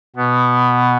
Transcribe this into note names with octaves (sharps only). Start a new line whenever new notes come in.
B2 B3